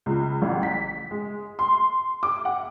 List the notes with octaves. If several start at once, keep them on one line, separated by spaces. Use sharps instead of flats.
C#2
A1
B6
G#3
C6
D6
F#5